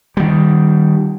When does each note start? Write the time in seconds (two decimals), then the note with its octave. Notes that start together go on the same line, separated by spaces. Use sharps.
0.17 D#3 G3